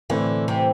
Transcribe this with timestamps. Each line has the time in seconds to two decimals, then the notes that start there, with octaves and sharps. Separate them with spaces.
0.10 A2 D3 E3 A3 C4
0.48 C3